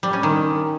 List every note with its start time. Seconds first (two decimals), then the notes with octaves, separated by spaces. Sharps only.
0.03 G3
0.13 C#4
0.23 D#3